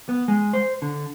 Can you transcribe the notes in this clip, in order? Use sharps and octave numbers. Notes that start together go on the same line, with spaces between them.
B3
G#3
C5
D3